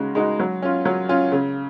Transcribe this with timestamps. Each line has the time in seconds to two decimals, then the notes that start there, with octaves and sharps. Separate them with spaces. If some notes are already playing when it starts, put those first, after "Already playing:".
Already playing: C#3 G#3 D#4 F#4
0.15 G#3 D#4 F#4
0.40 F#3
0.62 C#4 F4
0.85 F#3
1.09 C#4 F4
1.32 C#3